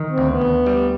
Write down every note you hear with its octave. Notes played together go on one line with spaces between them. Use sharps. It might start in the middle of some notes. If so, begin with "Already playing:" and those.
Already playing: D#3
C4
D2
B3
D2
G3